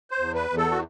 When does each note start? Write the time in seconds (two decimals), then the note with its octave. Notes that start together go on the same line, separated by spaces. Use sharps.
0.11 C5
0.19 E2
0.35 B4
0.50 E2
0.57 A4
0.71 F#4